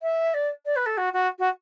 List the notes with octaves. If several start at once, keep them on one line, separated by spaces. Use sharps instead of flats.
E5
D5
D5
B4
A4
F#4
F#4
F#4